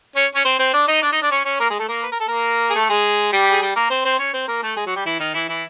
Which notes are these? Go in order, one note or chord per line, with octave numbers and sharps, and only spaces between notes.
C#4 C#5
C#4 C#5
C4 C5
C4 C5
D4 D5
D#4 D#5
D4 D5
D#4 D#5
D4 D5
C#4 C#5
C#4 C#5
A#3 A#4
G#3 G#4
A3 A4
A#3 A#4
B4
A#4
A4
A#3 A#4
G#4
A3 A4
G#3 G#4
G3 G4
G#4
G3 G4
A#3 A#4
C4 C5
C4 C5
C#4 C#5
C4 C5
A#3 A#4
A3 A4
G#3 G#4
F#3 F#4
G3 G4
E3 E4
D#3 D#4
E3 E4
E3 E4